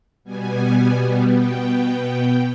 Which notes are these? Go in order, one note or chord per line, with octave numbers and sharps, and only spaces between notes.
B2 G3 B3 G#5
B2 B3 G5